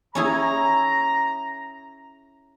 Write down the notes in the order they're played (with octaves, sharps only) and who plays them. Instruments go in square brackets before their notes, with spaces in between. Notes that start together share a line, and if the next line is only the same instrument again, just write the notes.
[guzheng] C#4 E4 G#4 [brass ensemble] A#5